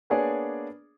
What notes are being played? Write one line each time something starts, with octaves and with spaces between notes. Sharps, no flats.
A#3 B3 D4 G#4 C#5 D5